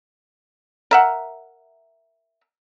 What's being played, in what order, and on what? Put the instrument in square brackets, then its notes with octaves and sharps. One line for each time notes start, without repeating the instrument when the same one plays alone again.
[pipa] A#4 E5 F#5